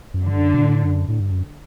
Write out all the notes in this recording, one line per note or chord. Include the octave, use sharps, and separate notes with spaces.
F#2
G2 D3
F#2
B2
A2
F#2
A2
G2
F#2